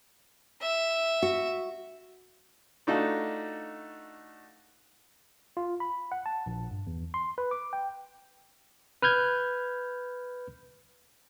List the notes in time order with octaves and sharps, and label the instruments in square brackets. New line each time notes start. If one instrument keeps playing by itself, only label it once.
[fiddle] E5
[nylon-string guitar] F#4
[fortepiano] A3 D4 D#4 F4 F#4 A4
[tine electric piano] F4
B5
F#5
A5
A#1
G2
E2
C6
B4
D6
G5
B4 F6 G6 G#6